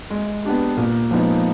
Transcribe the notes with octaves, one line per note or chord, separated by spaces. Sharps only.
G#3
B3 D4 G4
A#2
F3 G#3 B3 D#4